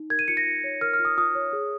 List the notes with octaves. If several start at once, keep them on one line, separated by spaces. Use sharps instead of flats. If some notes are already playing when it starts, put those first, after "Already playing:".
Already playing: D#4
A#4 G#6
D#7
F4 C#7
A#6
F4
C#5
A#4 F6
F6
F4
D#6
F4 D#6
C#5
G#4